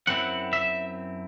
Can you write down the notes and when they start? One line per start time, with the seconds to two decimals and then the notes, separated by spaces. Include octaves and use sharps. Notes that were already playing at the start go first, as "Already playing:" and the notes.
0.07 F#2 F#3 C4 E4 F#5
0.53 E5